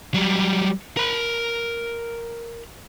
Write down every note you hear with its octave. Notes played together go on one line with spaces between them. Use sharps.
F#3 G3
A#4 B5